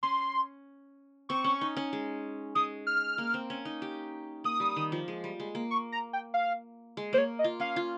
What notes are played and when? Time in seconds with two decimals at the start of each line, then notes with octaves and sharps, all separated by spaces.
0.03 C#4 C6
1.29 C4 C#6
1.44 C#4
1.61 D#4
1.77 C#4
1.93 G#3
2.55 G#3 D#6
2.87 F6
3.18 A#3
3.34 C4
3.50 C#4
3.65 D#4
3.82 G4
4.44 A#3 D#6
4.60 G3
4.76 D#3
4.92 F3
5.08 G#3
5.24 G3
5.40 G#3
5.55 A#3
5.71 C#6
5.92 A#5
6.13 G5
6.34 F5
6.97 G#3
7.13 A#3 C5
7.18 C#5
7.39 D#5
7.44 F4
7.60 C#4 F5
7.76 F4